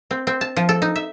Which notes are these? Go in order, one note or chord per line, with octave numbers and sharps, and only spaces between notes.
C4
C4
A5
F3
A4
D#4
E5